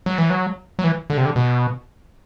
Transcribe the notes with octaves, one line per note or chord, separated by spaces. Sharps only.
F#3
E3
F#3
F#3
E3
D3
C3
D3
B2